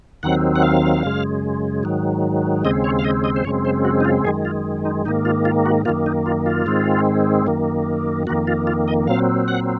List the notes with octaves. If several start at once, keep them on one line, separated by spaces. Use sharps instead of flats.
D#2 D#3 F#3 C4 F#5
F#5
F5
F#2 C#3 G#3
G#2 D#3 F#3
D#2 C#3 G#3 C4 D#5
C#5
F5
D#5
D#5
C5
F#2 C#3 G#3 C4 C#5
C5
F#4
D#4
F4
F#2 D#3 G#3 G#4
F4
D#4
G#2 D#3 A#3 D#4
F4
F4
F#4
F#2 D#3 A#3 F4
D#4
F4
F4
G#2 D#3 G#3 C4
F#2 D#3 A#3
F2 D#3 A#3 F#4
F4
F4
D#5
A#2 F#3 C4 F5
F#5